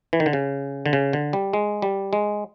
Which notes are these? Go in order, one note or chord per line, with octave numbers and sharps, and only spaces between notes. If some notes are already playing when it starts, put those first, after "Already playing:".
E3
D#3
D3
C#3
D3
C#3
D3
G3
G#3
G3
G#3